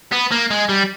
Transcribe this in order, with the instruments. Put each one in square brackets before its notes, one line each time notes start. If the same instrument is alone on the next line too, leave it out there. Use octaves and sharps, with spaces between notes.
[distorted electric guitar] B3
A#3
G#3
G3